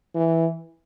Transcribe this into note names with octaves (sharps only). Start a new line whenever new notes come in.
E3